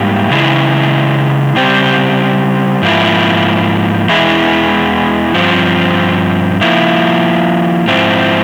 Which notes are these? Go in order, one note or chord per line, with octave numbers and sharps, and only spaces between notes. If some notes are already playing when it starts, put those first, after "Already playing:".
Already playing: G#2 G3 A#3 E4 G4
C#3 E3 G#3 E4 G#4
C#3 G3 C4 G4 C5
G#2 F3 A#3 E4
E2 E3 G#3 E4
G2 F3 C4
F3 A#3 E4
G#2 F3 C4 E4